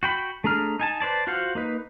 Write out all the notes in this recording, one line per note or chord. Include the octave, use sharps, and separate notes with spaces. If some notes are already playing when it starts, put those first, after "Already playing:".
F#4 G5 B5
A3 D4 G#4 A#5 F6
D#4 G#5 A5
B4 C5 D5 A5
F4 F#4 C5 F5 F#5
A#3 D#4 B4